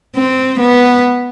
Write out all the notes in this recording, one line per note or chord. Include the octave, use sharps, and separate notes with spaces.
C4
B3